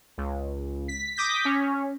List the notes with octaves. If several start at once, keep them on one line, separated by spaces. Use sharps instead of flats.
C#2
B6
D6 D#6 G6 A#6 B6
C#4